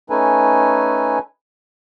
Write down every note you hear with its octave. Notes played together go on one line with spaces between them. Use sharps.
A3 C#4 D#4 A4 B4 G#5